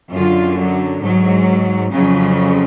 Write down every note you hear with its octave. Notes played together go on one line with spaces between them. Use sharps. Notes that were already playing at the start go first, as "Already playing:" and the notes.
F#2 D3 F4
F#3
G#2 F#3
F2 C#3 F#3